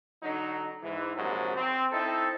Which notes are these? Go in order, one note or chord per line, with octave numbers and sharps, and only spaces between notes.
D3 F#3 D#4
G#2 E3
A#1 G#2 C3 F#3
C4
C4 D#4 E4 A4